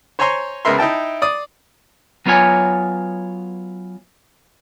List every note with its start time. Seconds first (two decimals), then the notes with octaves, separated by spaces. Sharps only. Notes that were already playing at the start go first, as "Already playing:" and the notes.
0.19 C5 C#5 G#5 A#5 C6 C#6
0.65 C#2 G#3 B3 A#4 E5 C6
0.78 D#4 E4 G5 A5
1.22 D5 D#6
2.26 F#3 B3 F4 C#5 G#5